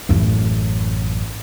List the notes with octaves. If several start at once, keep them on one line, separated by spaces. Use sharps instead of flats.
A1 F#2